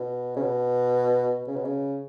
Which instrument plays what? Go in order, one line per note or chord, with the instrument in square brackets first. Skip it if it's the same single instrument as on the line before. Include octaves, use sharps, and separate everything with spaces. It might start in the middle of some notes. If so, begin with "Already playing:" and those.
Already playing: [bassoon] B2
C#3
B2
C#3
B2
C#3